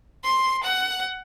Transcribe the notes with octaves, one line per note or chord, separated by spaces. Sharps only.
C6
F#5